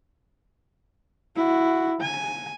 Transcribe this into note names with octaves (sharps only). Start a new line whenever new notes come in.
E4 F#4
G#5